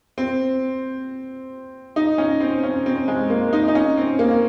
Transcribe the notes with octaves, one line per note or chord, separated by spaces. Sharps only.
C4
D#4
C#4
C4
C#4
C4
G#3
A#3
D#4
D#4
C#4
C4
A#3